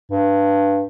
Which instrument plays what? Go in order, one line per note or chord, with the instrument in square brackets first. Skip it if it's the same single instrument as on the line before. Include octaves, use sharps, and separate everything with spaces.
[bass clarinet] G2